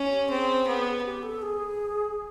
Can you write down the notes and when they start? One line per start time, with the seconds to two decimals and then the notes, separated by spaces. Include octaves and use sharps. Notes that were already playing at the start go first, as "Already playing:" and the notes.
Already playing: C#4
0.11 G4
0.30 C4 G#4
0.67 B3
1.04 G4
1.23 A4
1.42 G#4